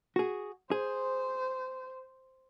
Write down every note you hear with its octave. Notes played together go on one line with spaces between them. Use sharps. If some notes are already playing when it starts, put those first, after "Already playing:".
F#4 G#4
G#4 C5